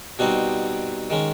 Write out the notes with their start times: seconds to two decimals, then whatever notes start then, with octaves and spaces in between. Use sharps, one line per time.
0.19 B2 G3 C4 D#4 F#4
1.10 D#3 G#3 C#4